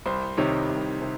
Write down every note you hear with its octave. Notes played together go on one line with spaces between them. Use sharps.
C2 C5
C3 D#3 C#5
C2
C3